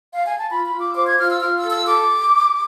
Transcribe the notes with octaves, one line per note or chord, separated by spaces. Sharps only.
F5
G#5
A5
F4 B5
B5
F4
D6
E6
C5 D6
G#6
F4 F6
E6
F4 F6
E6
A4
E6
A4 D6